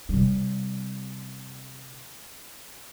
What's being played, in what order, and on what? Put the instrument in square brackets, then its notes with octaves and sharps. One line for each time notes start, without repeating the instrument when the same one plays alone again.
[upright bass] C3 G3